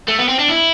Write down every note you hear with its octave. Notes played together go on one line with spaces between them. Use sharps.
A3
B3
C4
D4
E4